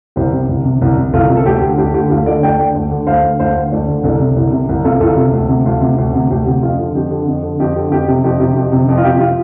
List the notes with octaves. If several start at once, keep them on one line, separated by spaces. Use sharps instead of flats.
C2 G4 C5
C3
C2
C3
C2
C3
C2 F4 A4
C3
A4
D2 G4
D3
D2 G4
D3 G4
D2 F4 A4
D3 A4 D5
D2 D5 G5
D3
D2
D3
D2 C5 F5
D3
D2 C5 F5
D3
D2 A4 D5
D3
C2 A4 D5
C3
C2
C3
C2
C3 F4 A4
C2 F4 A4
C3
D2
C3
D2 F4
C3
D2
C3
D2 G4
C3 G4
F2 F4
D3
F2 G4
D3
F2
D3
F2 G4
D3
F2 G4
C3
F2 G4
C3 G4
F2 G4
C3
F2
F4
C3 G4
F4